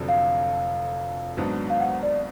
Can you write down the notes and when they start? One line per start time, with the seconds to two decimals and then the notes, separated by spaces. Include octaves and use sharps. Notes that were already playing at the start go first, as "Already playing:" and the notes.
Already playing: F1 F2 D3 F#3 D4
0.09 F5
1.37 G#1 G#2 F#3 B3 D4
1.70 F5
1.80 F#5
2.03 D5